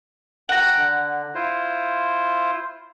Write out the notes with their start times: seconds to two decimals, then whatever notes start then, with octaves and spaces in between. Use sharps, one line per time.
0.49 F#5 G5 A#5
0.77 D3
1.35 E4 F4 C5